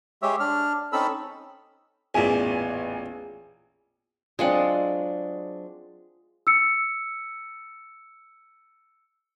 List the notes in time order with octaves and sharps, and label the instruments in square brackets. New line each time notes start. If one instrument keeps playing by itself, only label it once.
[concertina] G#3 G4 C#5 E5
D4 F6
C4 C#4 D#4 A4 B5 E6
[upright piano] A1 G#5 [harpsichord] E2 A#2
[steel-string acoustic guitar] F#3 C4 D4 [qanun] G#3 F4 F#5
[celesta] E6 C#7